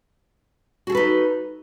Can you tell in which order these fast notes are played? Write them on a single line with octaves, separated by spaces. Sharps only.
F#4 G#4 A4 B4 D#4